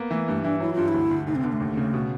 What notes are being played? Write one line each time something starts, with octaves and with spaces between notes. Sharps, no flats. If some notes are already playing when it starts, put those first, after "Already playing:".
Already playing: A#3 B3
E3 A3
G2 A3
E3 D4
F#3 E4
G2 F4
E4
D2
D2
F1 D#4
C4
D3 B3
A3
D#2
C#3
B2